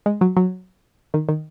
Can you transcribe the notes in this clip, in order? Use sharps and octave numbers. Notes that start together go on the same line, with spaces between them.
G#3
F#3
F#3
D#3
D#3